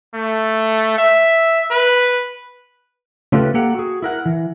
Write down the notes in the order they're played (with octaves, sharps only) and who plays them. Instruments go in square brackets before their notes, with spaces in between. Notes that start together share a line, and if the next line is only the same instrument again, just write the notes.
[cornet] A3
E5
B4
[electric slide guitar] C#3 A3 F4 G4 A4 B4
A#3 G4 A4 F#5 G5 A#5
F#4 G#4
E4 A#4 F#5
E3